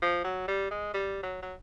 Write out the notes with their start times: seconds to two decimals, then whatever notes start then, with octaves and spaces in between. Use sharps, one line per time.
0.02 F3
0.24 F#3
0.48 G3
0.71 G#3
0.94 G3
1.23 F#3
1.42 F#3